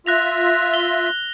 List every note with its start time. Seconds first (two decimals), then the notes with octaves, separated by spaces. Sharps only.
0.06 F4 E5 F#6 A#6 F7
0.74 G7